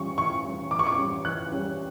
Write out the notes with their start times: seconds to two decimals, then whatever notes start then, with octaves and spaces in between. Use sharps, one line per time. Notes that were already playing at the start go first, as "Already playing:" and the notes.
Already playing: E3 G3 C#4 C#6
0.18 E3 C#6
0.44 G3 C#4
0.71 E3 D6
0.79 C#6
0.87 D6
0.98 G3 C#4
1.25 E3 F#6
1.52 G3 C#4